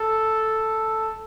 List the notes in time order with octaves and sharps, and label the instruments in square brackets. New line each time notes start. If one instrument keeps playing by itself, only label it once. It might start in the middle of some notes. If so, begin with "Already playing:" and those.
Already playing: [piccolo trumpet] A4